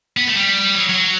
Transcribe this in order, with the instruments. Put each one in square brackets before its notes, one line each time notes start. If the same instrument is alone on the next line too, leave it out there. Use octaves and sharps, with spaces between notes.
[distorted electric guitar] B3
A3
G3
F#3
F#3